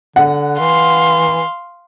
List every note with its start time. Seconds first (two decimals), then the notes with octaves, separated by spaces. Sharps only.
0.16 D3 F#5
0.60 E3 F5 C6